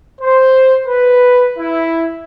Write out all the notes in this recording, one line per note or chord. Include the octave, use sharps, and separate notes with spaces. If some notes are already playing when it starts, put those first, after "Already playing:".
C5
B4
E4